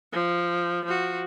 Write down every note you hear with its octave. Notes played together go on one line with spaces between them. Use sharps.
F3
F3 F#4